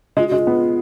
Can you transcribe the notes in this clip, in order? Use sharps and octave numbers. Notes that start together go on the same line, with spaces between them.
G#3 F4
G#3 F#4
F4
B3